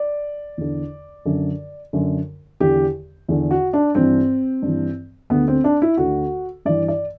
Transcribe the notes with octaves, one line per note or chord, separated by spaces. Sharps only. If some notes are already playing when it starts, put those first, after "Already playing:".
Already playing: D5
E2 D3
F#2 D3
F#2 D3
E2 D3 G4
E2 D3
F#4
D4
G2 E3 C4
G2
E3
D2 D3 B3
C4
D4
E4
D2 D3 F#4
G2 E3 D5
D5